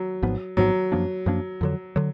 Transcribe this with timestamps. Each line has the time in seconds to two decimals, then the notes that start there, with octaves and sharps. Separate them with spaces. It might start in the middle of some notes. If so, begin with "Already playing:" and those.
Already playing: F#3
0.23 G#1 G#2 F3 B3
0.57 G#1 G#2 F3 F#3 B3
0.92 F#2 F3 A#3 D4
1.26 F#2 F3 A#3 D4
1.61 F2 D3 F#3
1.96 D3 F#3